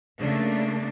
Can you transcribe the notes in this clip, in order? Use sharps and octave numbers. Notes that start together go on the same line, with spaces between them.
C#3 A3 A#3 D4